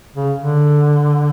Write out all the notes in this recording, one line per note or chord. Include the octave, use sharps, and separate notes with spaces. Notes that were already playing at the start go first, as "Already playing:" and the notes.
C#3
D3